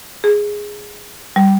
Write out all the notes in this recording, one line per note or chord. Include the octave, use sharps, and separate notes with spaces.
G#4
G3